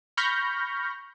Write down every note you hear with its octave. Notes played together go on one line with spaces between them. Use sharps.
B5 C#6 F6 G6 A#6